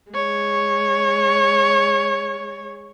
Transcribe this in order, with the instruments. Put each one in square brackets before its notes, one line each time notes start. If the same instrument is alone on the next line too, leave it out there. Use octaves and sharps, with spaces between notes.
[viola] G#3 C#5